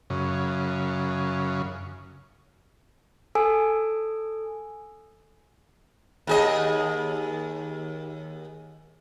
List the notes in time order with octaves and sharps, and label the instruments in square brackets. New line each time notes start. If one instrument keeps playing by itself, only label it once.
[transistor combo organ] F#2 C#3
[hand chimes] A4 G#5 E6
[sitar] D#2 G#4 D#5